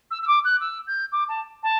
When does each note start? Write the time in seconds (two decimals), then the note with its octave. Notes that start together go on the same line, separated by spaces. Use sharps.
0.11 E6
0.22 E6
0.27 D6
0.45 F#6
0.61 E6
0.87 G6
1.12 D6
1.29 A5
1.63 A5